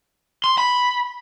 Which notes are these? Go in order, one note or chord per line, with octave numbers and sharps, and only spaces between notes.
C6
B5